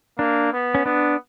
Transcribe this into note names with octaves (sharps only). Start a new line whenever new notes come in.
A#3 D4
B3
C#4
B3 D4